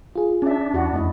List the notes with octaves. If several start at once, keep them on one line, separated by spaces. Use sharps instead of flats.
F4 G#4
C#4 D4 E5
E2 E4 F#4 F#5
F2 A3 E4 D#5